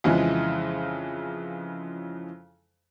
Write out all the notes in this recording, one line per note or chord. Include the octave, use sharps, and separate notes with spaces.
F2 C#3 E3 F3 G#3